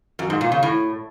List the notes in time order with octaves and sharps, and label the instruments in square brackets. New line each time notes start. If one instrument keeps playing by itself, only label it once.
[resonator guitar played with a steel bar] F#2
G#2
A#2
C#3
A2